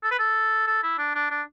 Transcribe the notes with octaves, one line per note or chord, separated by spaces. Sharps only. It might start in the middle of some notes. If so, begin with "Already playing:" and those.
A4
B4
A4
A4
E4
D4
D4
D4